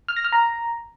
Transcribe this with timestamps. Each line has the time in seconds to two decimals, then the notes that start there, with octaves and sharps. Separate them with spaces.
0.08 F6
0.16 A#6
0.24 F6
0.32 A#5